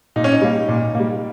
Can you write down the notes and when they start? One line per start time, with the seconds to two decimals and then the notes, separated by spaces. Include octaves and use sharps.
0.16 A#2 D#4
0.24 C#4
0.32 D#4
0.42 G3 A#3
0.69 A#2
0.95 G3 A#3